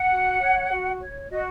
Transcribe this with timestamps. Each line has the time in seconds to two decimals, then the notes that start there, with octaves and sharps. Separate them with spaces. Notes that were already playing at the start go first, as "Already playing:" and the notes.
Already playing: F#5
0.11 F#4
0.41 C#5
0.71 F#4
1.01 C#5
1.30 F#4 D#5